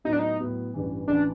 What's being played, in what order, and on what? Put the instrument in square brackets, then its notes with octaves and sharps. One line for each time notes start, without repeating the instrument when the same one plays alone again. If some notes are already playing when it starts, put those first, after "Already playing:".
[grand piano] A2 F#3 B3 [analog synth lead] D#4
[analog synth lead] D4
D#4
[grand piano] A2 F#3 B3
A1 G2 E3
[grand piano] A1 E3 [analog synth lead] D4